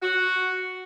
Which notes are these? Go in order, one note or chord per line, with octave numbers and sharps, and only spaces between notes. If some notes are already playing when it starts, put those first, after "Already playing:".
F#4